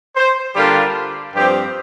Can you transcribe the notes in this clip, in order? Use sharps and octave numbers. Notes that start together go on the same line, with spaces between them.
C5
D3 G3 A#3 D4 F4 G4
G2 F3 C4 F4 G4